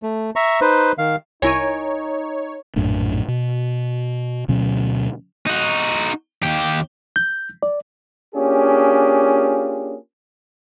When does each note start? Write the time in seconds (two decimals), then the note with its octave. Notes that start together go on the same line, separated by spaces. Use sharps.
0.03 A3
0.36 E5 A#5 C#6
0.61 D#4 B4 C5
0.98 D#3 F5
1.42 C2 D#4 E4 A#4 C#5 G#5 C#6 D#7
2.76 A#1 F#2 A2 D4
3.28 B2
4.48 D2 B2 F#3 C#4
5.46 D#4 F#4
6.43 D#2 G4
7.16 G6
7.63 D5
8.35 A#3 C#4 D4 F4 G4 G#4